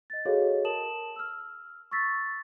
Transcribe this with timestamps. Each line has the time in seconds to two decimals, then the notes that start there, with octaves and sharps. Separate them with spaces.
0.10 D#5 A6
0.25 F#4 G#4 A4 C#5 D#5 F5
0.65 A#4 A5 D#6 E7 F#7
1.16 E6 F6
1.91 C#6 E6 A6 B6